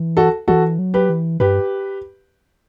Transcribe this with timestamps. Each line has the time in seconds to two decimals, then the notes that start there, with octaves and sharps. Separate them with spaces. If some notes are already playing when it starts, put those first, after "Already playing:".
Already playing: E3
0.17 F#4 A4
0.48 E3 F#4 A4
0.79 F#3
0.94 G4 B4
1.09 E3
1.40 G2 G4 B4